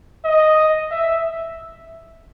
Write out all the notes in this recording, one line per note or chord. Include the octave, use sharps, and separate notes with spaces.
D#5
E5